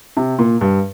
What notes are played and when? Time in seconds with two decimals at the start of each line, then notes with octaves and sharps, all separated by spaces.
0.17 C3
0.39 A#2
0.61 G2